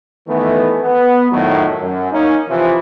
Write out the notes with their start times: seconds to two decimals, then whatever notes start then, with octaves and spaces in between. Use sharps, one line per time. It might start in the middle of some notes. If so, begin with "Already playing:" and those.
0.28 D#3 E3 A3 B3
0.82 B3
1.31 F2 A2 D#3 F#3
1.80 F#2
2.11 A#3 C#4 D#4
2.49 C3 E3 F3